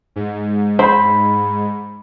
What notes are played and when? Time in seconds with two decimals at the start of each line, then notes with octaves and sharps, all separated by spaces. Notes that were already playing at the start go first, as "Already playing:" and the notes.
0.16 G#2
0.79 C5 B5